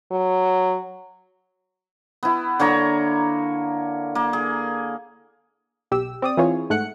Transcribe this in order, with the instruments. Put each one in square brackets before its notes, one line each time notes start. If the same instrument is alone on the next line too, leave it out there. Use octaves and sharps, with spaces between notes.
[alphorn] F#3
[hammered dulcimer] B3 E4
D3 A#3 C#5 A#5
A#3
G#4
[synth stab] B1 G4 E6
C4 D5 D#6
E3 C4 E4 F4 G#4 C#5
G#2 A3 F#5 F#6 C#7